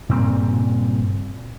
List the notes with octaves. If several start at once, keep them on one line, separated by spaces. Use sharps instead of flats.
G2 A#2 C#3 C4